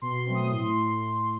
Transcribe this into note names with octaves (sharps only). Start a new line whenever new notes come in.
B2 C6
C6
F#3 A3 C4
D#6
A2 C6